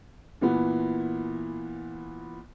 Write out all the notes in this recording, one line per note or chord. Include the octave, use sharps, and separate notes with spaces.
A#2 E3 B3